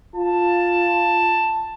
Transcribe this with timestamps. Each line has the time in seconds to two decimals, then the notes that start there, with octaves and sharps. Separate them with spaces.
0.16 F4 A5